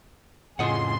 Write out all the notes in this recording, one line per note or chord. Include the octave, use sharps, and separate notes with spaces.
F2 A2 C#3 F3 G#4 D#5 F#5 C6